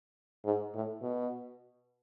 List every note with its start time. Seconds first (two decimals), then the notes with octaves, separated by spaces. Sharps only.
0.45 G#2
0.74 A2
1.02 B2